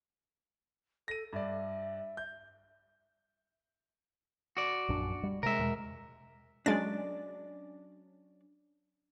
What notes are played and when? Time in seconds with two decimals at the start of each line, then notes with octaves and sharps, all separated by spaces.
1.08 A4 A#6 D#7
1.33 G2 D5 E5
2.17 G6
4.57 F#4 D5
4.89 A#1 F#2 D4
5.23 G3
5.43 C3 G#3 A#4 E5
5.59 E2 B2 G#3
6.66 F#3 G#3 C#4 D4 D5 A6